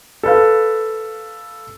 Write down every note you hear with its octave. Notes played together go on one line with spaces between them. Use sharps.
A4 B4 F5